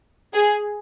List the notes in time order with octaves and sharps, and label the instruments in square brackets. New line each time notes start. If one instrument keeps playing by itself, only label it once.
[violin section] G#4